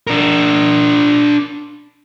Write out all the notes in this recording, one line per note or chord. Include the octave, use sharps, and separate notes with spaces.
D4 A#4